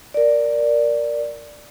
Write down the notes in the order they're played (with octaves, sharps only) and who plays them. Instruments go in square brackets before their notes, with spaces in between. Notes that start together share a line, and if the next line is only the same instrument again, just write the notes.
[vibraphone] A#4 D5